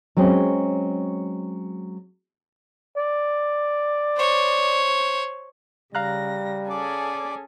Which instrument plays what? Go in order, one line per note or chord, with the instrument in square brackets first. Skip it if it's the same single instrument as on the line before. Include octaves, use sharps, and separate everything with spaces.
[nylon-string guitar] F#3 G#3 C4 C#4
[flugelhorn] D5
[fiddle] C5 C#5
[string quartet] C#3 A#6 [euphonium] G3 [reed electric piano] F5 A#5 F#6
[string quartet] C#4 G#4 A4 [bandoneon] D5 D6